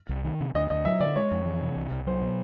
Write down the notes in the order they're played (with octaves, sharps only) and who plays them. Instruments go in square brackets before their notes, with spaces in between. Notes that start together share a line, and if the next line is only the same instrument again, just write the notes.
[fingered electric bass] C2
D#3
C3
[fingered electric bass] D2 [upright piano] D#5
[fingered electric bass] D2 [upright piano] D#5
[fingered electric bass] F#3 [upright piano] E5
[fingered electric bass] D3 [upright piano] D5
[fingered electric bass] G#3 [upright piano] C#5
[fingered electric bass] F2
E3
C3
C2
C2
[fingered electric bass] F#3 [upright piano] C5
[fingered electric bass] B2